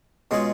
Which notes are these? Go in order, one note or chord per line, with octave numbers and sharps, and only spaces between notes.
B2 G#3 C#4 F4 G#4